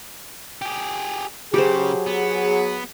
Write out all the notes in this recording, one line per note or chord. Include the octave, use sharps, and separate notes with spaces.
G4 G#4
C#3 F#3 G4 G#4 C5
B3